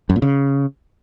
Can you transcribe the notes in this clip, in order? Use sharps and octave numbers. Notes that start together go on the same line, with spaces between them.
F#2
A#2
C#3